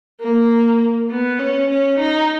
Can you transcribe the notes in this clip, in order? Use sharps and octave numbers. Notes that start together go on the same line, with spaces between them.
A#3
B3
C#4
C#4
D#4